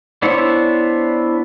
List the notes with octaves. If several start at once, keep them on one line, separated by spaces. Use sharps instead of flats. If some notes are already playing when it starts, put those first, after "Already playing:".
B3 D4 E4 C5 C#5